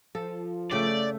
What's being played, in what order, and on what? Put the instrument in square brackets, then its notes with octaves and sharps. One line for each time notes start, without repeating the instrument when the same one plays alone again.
[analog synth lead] F3 [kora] A4
[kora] C#3 G5 [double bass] A3 [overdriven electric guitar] D5